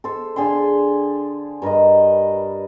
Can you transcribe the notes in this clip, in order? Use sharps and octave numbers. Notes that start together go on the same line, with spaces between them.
A4 C5
D3 G#4 G5 C6
G2 A#4 B4 D#5